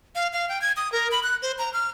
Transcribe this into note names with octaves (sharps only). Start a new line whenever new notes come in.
F5
F5
G5
G#6
D#6
A#4
B5
F#6
C5
A#5
F6